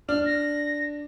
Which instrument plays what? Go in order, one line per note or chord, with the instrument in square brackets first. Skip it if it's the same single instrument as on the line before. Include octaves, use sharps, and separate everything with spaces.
[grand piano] D4 [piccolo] F6
[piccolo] A#6